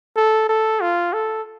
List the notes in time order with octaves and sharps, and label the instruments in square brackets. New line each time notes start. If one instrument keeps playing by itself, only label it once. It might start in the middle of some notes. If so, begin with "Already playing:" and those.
[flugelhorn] A4
A4
F4
A4